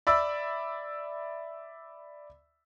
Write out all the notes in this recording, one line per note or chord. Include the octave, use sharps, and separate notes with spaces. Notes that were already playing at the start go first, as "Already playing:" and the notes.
D5 E5 B5 E6